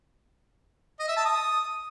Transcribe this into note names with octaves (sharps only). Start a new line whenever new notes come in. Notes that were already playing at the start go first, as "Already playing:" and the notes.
D#5
E5
A5
D#6